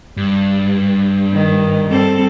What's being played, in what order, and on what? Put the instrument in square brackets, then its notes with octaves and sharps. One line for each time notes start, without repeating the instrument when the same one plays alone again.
[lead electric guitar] G2
[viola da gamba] D#3
G3 C4 A4